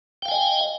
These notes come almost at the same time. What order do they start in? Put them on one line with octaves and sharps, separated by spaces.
G5 F5 G#5 D#5